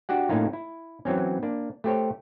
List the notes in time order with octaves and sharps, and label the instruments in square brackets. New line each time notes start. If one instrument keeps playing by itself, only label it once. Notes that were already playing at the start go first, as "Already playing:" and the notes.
[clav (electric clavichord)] D4 F#4 G4 F#5
A2 A3 A#3 C#4 D#4 F4
E4
E3 F#3 C4 C#4
A#3 D4
A3 G4 C5 C#5